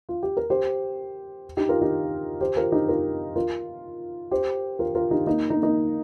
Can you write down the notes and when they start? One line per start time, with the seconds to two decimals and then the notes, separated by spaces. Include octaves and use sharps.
0.09 F4
0.23 G4
0.37 A#4
0.50 G4 C5
1.57 D#4 G4
1.69 F4 A#4
1.81 D#4 G4
2.41 G4 C5
2.56 F4 A#4
2.72 D#4 G4
2.89 F4 A#4
3.36 F4 A#4
4.31 G4 C5
4.79 F4 A#4
4.95 F4 A#4
5.11 D#4 G4
5.26 A#3 D#4
5.50 A#3 D#4
5.62 A#3 D#4